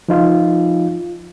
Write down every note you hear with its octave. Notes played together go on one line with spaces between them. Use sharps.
F3 D#4 F4